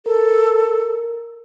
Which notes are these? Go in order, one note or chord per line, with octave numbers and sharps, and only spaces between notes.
A4 A#4